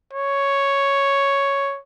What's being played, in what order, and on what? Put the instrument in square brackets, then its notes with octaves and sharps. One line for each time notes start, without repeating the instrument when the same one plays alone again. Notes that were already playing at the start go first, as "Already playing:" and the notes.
[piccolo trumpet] C#5